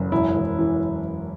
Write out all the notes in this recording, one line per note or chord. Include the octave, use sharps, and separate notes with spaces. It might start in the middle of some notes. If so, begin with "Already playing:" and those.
Already playing: F#1
E1 E4
E1
E3